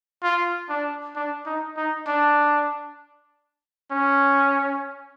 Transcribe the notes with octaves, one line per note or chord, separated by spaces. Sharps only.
F4
D4
D4
D#4
D#4
D4
C#4